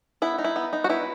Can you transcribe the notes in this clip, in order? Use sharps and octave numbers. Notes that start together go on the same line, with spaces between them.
B3 E4
D#4
E4
B3
D#4
F#4
B3 E4